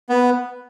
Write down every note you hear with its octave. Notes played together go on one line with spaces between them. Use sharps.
B3